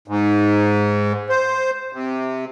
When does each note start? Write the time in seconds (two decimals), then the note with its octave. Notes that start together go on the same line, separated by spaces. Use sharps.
0.08 G#2
1.29 C5
1.93 C3